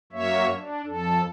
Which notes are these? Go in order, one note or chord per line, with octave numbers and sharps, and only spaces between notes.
F#2 F#3 A#3 C#5 E5
D4
F2 A4